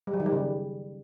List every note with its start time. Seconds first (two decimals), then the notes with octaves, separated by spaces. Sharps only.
0.07 G3
0.14 F#3
0.20 D#3
0.26 G3
0.32 C#3